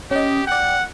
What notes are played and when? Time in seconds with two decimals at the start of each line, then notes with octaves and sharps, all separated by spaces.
0.11 C#4 G4 D#5
0.47 D5 F#5 G5